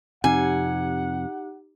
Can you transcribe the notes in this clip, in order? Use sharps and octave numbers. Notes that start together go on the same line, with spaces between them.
F2 C3 D#4 G4 F#5 G#5